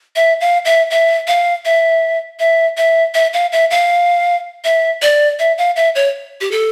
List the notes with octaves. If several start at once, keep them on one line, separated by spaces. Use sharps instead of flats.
E5
F5
E5
E5
F5
E5
E5
E5
E5
F5
E5
F5
E5
D5
E5
F5
E5
C#5
G4
A4